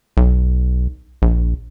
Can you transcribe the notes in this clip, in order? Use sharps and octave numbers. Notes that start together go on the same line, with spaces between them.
B1
A#1